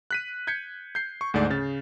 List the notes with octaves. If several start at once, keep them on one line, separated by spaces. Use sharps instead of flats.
F#6 B6 D#7
G6 G#6 B6 C#7
G6 C7
C#6
D2 G#2 A3 D5
C#3 A6